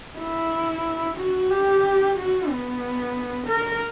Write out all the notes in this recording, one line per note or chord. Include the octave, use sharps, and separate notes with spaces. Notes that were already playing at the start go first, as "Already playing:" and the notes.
E4
F#4
G4
F#4
B3
A#4